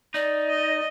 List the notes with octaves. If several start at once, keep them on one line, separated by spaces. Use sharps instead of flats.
D#4 D5
D#5